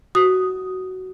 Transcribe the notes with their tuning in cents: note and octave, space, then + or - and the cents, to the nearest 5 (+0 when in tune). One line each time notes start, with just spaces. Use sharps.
F#4 +10 D#6 +0